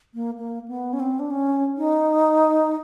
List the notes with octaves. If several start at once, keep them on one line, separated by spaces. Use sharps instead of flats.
A#3
A#3
B3
C#4
C4
D4
C#4
D#4